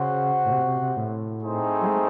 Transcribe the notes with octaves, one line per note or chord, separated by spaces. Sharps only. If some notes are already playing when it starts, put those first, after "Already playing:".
Already playing: C#3 F#4 C5 F#5
A2
C3
C3
C3
A2
A3 C4 D#4 G#4 C5
F#3
G#3